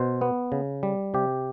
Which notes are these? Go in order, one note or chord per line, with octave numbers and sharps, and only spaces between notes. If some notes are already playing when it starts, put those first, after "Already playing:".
Already playing: B2 C5
B3
C#3
G3
C3 G4